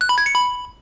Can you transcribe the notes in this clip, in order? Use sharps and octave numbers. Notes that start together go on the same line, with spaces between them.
F#6
B5
G#6
C#7
B5